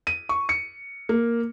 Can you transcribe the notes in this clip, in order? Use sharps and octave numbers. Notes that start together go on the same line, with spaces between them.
D#7
C#6
C#7
A#3